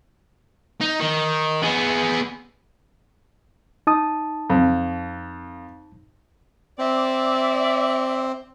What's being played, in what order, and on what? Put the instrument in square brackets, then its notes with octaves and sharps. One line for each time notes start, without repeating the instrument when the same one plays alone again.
[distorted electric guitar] D#4
D#3
B3 G#4
[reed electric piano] D#4 A5 D#6
[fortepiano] F2
[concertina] C4 [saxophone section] D5 E5